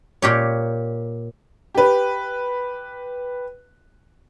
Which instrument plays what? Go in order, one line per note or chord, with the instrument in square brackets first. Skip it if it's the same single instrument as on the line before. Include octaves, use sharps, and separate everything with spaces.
[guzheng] A#2 G4 C#5
[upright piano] G4 B4